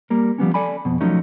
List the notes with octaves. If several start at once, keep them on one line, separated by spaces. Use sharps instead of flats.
G3 A#3 A#4
F3 G3 B3 C#4
A4 D5 G#5 B5
F2 B2
F3 F#3 A3 C#4 D#4